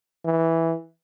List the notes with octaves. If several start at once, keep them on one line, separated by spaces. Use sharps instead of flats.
E3